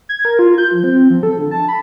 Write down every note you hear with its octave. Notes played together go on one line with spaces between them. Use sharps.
G#6
A#4
F4
G6
F3
C4
F3
A4
D3
A5
B5